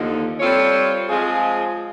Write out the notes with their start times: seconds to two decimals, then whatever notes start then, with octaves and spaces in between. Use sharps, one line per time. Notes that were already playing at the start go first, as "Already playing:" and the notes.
Already playing: D#2 D3 F3 A#3 D#4
0.40 G3 C4 F4 A4 C#5
1.09 F3 G#3 C4 F4 G#4